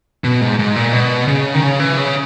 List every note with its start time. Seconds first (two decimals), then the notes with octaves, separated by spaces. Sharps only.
0.24 B2
0.41 G#2
0.59 G#2
0.76 A#2
0.93 B2
1.28 C#3
1.54 D#3
1.63 C#3
1.80 E3
1.97 C#3